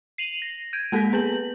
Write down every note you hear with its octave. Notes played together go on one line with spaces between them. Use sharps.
C7 D#7 F7 F#7
A#6
G6 G#6 D7 D#7
G#3 A#3 A4 A#6 B6
B3 B4 G6 F#7